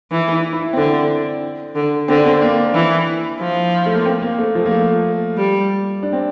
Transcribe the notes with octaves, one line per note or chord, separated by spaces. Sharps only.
E3 E4
E4
E4
C4
D3 D4
D3
D3 C4
D4
C4
A#3
E3 E4
F3
A3
A#3
C4
A#3
A3
F3
A#3
A3
G3
D4
C4